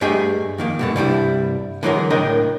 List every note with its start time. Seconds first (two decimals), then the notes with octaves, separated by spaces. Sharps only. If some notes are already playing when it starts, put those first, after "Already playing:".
0.01 G2 A3 G4 G#4 D#5 G#5
0.58 F2 D#3 A#3
0.79 G2 B2 A3
0.96 C2 G2 G3 E4
1.83 D3 E3 F#3 G#3 A#4
2.10 C#2 A2 D4 A#4 D#5 G5